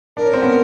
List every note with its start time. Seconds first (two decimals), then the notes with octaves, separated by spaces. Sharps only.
0.17 D4 A#4
0.25 C#4
0.34 C4
0.42 B3 C#4